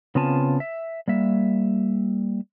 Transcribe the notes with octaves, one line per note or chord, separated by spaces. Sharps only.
C#3 B3 C4 F4 G#5 A5
E5
G3 A#3 E5